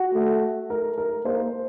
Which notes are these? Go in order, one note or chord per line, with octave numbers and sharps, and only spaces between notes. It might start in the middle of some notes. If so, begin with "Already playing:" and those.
Already playing: F#4
A3
A#4
A#4
A#3 C5